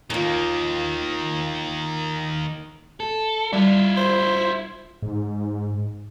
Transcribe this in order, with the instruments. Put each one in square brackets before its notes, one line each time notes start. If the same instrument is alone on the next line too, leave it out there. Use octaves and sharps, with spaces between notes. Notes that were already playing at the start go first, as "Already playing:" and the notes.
[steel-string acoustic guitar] D#2 F4 [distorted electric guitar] D#3 A#3
[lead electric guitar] A4
[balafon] G3 [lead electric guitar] E4 F4
[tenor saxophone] C5
[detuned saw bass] G#2